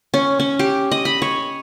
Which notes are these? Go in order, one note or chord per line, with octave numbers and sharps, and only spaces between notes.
C#4
C#4
G4
D#5
B5
C#5